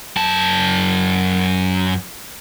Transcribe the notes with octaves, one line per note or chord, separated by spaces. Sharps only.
F#2 A5